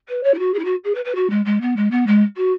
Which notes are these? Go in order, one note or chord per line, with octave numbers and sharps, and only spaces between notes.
B4
C#5
E4
F#4
G#4
E4
F#4
G#4
B4
B4
F#4
G#3
G#3
B3
G#3
B3
G#3
F#4